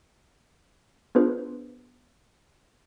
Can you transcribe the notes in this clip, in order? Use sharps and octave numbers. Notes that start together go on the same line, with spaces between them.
B3 D4 F4 G#4 B4 C5